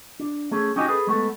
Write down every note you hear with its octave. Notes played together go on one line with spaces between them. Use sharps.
D4
A3 C#4 G#4
C#4 D#4 F#4 G4 D#5 G#5
G#4 A4 B4
G#3 A3 B3 A4